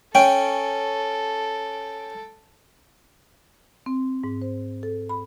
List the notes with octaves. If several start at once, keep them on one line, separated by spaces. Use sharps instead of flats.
C#4 A4 G5
C4
G#2
C5
A4
B5